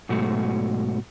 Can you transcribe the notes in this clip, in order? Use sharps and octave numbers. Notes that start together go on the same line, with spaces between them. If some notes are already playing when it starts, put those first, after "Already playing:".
G#2 B2 F#3 A3 F#4